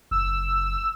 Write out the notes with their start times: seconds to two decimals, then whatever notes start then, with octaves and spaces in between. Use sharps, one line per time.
0.11 F#1 E6